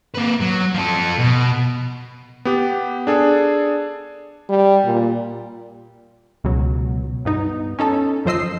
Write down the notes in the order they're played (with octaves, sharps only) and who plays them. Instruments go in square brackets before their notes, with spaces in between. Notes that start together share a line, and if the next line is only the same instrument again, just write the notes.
[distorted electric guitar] A#3 B4
F#3
F3 A4
B2
[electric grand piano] B3 G4
D4 G#4 A4
[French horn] G3
A#2
[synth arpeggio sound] C#2 B2 F#3
G2 B3 D#4
C#4 D#4 A4 A5
F#2 F3 C5 D#5 E6 C7